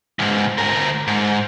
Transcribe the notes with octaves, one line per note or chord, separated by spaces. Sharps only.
C#2 G#2
D2 A#4
G#2